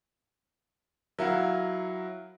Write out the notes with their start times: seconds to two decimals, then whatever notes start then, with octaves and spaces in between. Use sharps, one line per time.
1.19 F#3 E4 A#4 F5 F#5